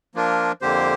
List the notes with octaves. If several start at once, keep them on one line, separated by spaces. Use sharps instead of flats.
F3 A#3 D4 F4 A#4
F2 D3 A#3 G4 C5